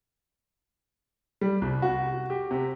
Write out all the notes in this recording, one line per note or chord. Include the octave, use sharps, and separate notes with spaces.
G3
C2
F#4
G4
C3